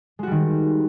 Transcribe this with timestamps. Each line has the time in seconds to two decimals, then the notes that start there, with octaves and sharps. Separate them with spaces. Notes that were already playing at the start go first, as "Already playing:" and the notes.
0.19 G#3
0.23 F#4
0.27 G3
0.31 D#3